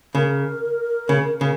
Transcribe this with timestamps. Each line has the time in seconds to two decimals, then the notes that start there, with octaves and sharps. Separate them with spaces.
0.15 C#3 A#4
1.09 C#3
1.41 C#3